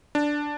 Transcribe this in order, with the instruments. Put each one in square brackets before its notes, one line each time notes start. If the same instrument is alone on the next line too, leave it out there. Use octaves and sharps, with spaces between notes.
[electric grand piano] D4